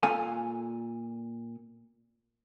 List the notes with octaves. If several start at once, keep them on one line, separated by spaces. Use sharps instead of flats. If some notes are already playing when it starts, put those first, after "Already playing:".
A#2 A4 F5 G#5